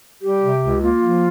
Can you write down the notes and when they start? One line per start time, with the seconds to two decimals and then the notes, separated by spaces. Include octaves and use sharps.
0.22 G3 G4
0.41 C3
0.61 C#2
0.81 A#3 F4
1.01 F3